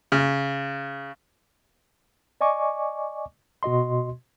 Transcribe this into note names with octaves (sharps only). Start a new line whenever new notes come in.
C#3
D5 D#5 G#5 C#6 D6
B2 F#4 D#5 C6